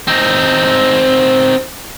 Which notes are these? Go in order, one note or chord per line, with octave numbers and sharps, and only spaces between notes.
C4 D#4